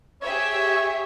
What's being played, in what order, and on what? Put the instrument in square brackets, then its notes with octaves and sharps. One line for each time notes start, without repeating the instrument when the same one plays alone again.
[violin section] G4 G#4 E5 [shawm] C#5